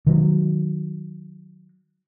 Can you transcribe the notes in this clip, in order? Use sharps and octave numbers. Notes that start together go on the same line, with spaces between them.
D#3 F#3